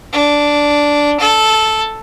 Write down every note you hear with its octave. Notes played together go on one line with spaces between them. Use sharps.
D4
A4